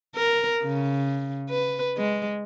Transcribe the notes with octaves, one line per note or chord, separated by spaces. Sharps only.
A#4
C#3
B4
G#3